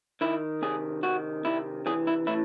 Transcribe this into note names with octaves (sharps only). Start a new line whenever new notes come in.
D#3 E4
C3 G#4
D#3 F#4
C3 E4
E3 G#4
E4
A2 E4